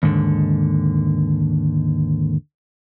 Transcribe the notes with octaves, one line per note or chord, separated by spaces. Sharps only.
D#2 G#2 D3